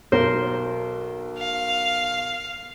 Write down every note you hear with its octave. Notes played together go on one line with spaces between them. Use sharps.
B1 A#4 C5
F5